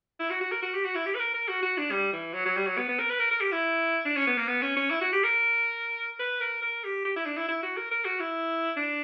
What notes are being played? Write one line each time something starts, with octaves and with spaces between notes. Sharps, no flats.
E4
F#4
F#4
A#4
F#4
G4
F#4
E4
G4
B4
A#4
A#4
F#4
F#4
D4
G3
E3
F#3
F#3
G3
F#3
B3
B3
A#4
B4
A#4
A#4
G4
E4
D4
C#4
B3
A#3
B3
C#4
C#4
E4
F#4
G4
A#4
B4
A#4
A#4
G4
G4
E4
D4
E4
E4
F#4
A#4
A#4
F#4
E4
D4